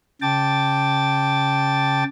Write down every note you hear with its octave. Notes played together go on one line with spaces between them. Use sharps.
C#3 G5 A5 D6 A6